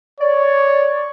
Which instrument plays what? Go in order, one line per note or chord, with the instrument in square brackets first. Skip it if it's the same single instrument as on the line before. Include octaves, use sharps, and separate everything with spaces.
[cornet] C#5 [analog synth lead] D5